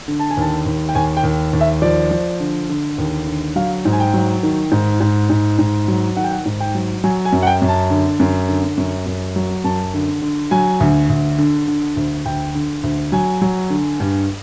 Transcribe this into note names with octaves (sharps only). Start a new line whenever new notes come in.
D3
A5
G#5
D#2 A5
D#2
G5
D#2 G#5
G5
D#2
D#2
E5
F3 D5
F3
D3
D3
D#2
D3
F#3 F5
G#2
G#5
G5
F#3
D#3
G#2
G#2
G#2
G#2
F#3
D#3 F#5
G5
F#5
G#2
G5
F#3
F#3 G#5
G#5
F#2
F#5
G5
F#2
A5
D3
F#2
D3
F#2
F#2
F#3
F#2 A5
D3
D3
F#3 G#5
D2
D2
D3
D3
D2
D2 G5
D3
D2
F#3 G#5
F#3
D3
G2